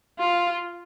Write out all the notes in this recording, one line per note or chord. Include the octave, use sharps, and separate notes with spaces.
F4